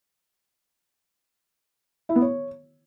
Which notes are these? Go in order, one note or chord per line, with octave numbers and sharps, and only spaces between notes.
E4
B3
C#5